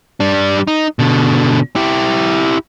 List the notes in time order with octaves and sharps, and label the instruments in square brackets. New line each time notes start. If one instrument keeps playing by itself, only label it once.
[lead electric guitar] G3 D4
D#4
B2 D3
E4 G4